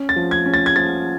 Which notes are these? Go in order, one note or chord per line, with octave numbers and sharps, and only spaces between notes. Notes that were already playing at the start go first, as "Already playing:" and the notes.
Already playing: C#4
A6
F3
G#6
C#4
A6
G#6
F3 A6